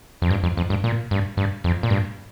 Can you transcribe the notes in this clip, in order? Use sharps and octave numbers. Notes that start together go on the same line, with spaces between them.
F2
G2
F2
F2
G2
A#2
G2
G2
F2
A#2
G2